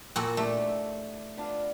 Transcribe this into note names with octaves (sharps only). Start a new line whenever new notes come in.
A#2 F#4 A4
A3 D4 E4 G4
B3 D4 F4